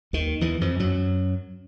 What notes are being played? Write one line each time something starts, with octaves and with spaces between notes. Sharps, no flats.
D#2 D#3
E2 E3
F2 F3
F#2 F#3